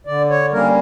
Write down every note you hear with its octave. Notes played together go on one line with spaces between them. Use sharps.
D3 D5
C#5
G3 A#3 C#4 A#4